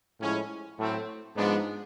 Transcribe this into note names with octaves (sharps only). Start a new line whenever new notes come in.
A2 F3 G#3 C#4 E4
A2 F#3 A3 C4
G#2 F3 G#3 B3 D4